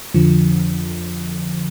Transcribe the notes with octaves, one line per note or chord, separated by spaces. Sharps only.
F2 D3 F3